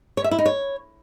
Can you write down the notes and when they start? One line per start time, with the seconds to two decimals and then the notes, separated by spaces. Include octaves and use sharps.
0.17 C#5
0.24 E5
0.31 E4
0.38 D#4
0.46 C#5